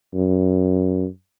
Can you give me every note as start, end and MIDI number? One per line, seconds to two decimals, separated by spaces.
0.14 1.06 42